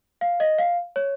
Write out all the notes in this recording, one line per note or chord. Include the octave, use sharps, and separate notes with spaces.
F5
D#5
F5
C#5